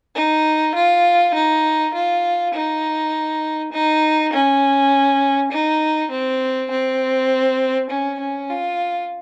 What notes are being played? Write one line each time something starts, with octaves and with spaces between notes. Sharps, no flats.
D#4
F4
D#4
F4
D#4
D#4
C#4
D#4
C4
C4
C#4
C#4
F4